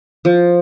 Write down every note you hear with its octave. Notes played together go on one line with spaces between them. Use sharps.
F3